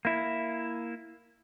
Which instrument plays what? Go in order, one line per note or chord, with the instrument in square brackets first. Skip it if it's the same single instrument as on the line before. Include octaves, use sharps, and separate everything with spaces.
[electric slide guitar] A#3 E4